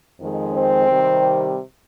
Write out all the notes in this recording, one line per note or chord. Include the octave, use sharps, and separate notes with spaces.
F2 D#3 G#3
C4
C3 D#3 G3